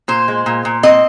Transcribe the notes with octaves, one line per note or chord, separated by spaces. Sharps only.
A#2 C5
G#3
A#2
A#2
C4 D#5